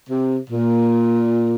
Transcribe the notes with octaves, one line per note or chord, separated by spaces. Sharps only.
C3
A#2